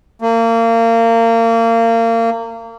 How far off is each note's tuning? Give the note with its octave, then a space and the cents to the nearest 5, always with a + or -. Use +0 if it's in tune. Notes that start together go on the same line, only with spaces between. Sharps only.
A#3 -30